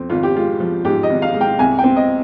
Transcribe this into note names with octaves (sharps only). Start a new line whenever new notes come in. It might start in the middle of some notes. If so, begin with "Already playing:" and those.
Already playing: F2 C4
G#1 F4
G4
G#3 F4
F3
G#2 G4
D#5
G#1
F5
G#3
G5
C2 G#5
G5
C4
D#5